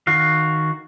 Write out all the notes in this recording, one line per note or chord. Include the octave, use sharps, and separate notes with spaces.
D#3 F#4 F5